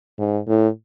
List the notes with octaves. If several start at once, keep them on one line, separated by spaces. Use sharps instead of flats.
G#2
A2